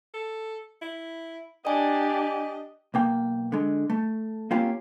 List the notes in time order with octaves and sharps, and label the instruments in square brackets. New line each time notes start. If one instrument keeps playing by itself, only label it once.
[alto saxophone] A4
E4
[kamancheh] D4 G4 [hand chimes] D5 G#5 [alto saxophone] D#5
[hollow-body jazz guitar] B1 A#3 G5
D3 G#3
A3
A#3 C4 C#4 F4 G4